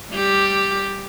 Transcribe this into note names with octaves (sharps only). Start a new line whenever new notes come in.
G3 G4